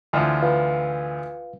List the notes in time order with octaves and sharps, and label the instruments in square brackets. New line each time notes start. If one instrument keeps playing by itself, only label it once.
[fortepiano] D2 E3 F3
[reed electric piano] F4 B4 F5